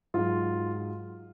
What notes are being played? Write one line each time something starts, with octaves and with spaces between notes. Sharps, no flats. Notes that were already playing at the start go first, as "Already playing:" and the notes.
G#2 F#3 F4